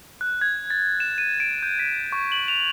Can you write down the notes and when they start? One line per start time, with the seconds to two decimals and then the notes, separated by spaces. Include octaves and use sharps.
0.21 F#6
0.41 G#6
0.70 A6
1.00 E7
1.18 D#7
1.40 D7
1.63 G6
1.79 B6
2.12 C#6
2.32 F#7
2.48 F7